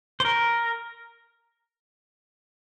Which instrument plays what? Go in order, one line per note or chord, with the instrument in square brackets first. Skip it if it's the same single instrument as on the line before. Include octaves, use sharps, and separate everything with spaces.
[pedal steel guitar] C5
A#4